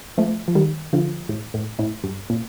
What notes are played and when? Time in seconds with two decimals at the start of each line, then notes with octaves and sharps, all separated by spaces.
0.18 F3 A3
0.48 F3
0.55 D#3 G3
0.93 D3 F3
1.29 A2
1.54 A2
1.79 A2
2.04 G2
2.30 A#2